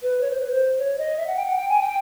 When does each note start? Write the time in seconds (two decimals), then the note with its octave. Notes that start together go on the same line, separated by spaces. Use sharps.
0.02 B4
0.21 C#5
0.31 C5
0.40 B4
0.50 C5
0.78 C#5
0.98 D#5
1.17 E5
1.27 F#5
1.36 G5
1.46 F#5
1.55 G5
1.68 G#5
1.81 G5